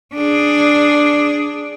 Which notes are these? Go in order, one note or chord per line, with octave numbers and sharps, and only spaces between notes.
D4 G#4